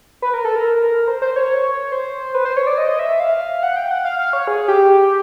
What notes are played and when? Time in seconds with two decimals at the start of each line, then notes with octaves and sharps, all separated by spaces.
0.22 B4
0.34 A#4
0.45 A4
0.56 A#4
1.08 C5
1.22 C5
1.36 C#5
1.92 C5
2.35 B4
2.45 C5
2.57 C#5
2.67 D5
2.78 D#5
2.99 E5
3.20 F5
3.63 F#5
3.76 G5
3.91 F#5
4.05 F5
4.19 F5
4.33 C#5
4.47 G#4
4.68 G4